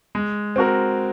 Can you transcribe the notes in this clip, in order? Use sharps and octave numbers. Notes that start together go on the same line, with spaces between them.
G#3
C4 F#4 A#4